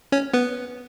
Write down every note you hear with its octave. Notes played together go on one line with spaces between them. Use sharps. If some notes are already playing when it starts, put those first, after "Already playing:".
C#4 C#5
B3 B4